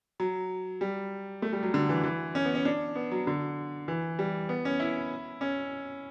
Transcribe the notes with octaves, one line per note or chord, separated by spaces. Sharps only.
F#3
G3
A3
G3
F#3
D3
E3
E3
C#4
B3
C#4
D4
B3
F#3
D3
E3
G3
B3
C#4
E4
C#4